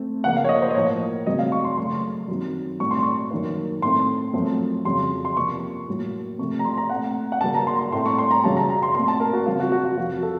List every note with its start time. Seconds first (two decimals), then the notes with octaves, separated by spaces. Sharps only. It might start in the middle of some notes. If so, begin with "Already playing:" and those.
Already playing: A3 C4
0.24 C#3 F3 A#3 F#5
0.37 F5
0.44 C#5
0.49 D#5
0.62 C5
0.71 D#5
0.75 A2 F3 A#3 C#5
1.26 C#3 F#3 A3 C4 D#5
1.39 F5
1.52 C#6
1.64 C6
1.77 F#2 C#3 A3 C6
2.28 F#2 D#3 F#3 C4
2.80 A2 F#3 A3 C4 C#6
2.91 C6
3.02 C#6
3.31 F#2 D#3 A#3
3.82 A2 A3 C4 C6
4.33 F#2 F3 A3 C4
4.85 F2 C#3 F#3 C6
5.25 C6
5.36 C3 F3 A#3 C#6
5.88 A2 F#3 A#3
6.38 C3 F3 A3 C4 C#6
6.59 A#5
6.65 C6
6.78 A#5
6.89 A#2 A3 C4 F#5
7.32 F#5
7.41 C#3 A5
7.44 F#3 A#3
7.54 A#5
7.67 C6
7.79 C6
7.92 A2 A3 C4 C6
8.06 C#6
8.18 C6
8.31 A#5
8.44 F#2 C#3 F#3 A5
8.57 A#5
8.70 A#5
8.83 C6
8.95 A#2 A3 C4 C6
9.08 A5
9.20 A#4
9.33 F#4
9.46 C#3 F#3 C4 F4
9.60 F#4
9.72 F#4
9.85 F4
9.97 F2 C3 F3 F#4
10.23 A4